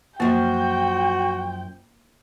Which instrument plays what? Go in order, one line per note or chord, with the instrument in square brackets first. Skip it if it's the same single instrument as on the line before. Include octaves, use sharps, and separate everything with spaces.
[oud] F#2 F3 [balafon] A#3 [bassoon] F#4 [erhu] G5